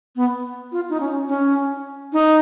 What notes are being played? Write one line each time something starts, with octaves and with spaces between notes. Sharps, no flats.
B3
F4
D#4
C#4
C#4
D#4